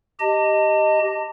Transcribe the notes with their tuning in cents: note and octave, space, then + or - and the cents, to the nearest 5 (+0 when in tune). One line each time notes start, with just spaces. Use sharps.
G4 -5 D#5 +0 A5 +35